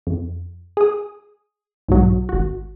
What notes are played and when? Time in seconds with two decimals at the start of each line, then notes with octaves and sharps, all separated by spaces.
0.07 F2
0.77 G#4 D#6
1.88 B1 G#2 F#3
2.29 G#1 F#4